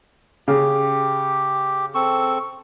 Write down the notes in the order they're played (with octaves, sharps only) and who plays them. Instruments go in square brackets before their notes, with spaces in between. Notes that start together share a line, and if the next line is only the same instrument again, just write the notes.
[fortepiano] C#3 [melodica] G4
[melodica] C4 A4 C#6